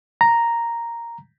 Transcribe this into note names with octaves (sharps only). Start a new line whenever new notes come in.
A#5